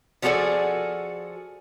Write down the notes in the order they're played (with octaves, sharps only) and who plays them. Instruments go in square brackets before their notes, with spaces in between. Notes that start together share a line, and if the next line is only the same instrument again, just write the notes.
[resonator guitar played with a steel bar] F3 G3 F#4 G#4 A4 D5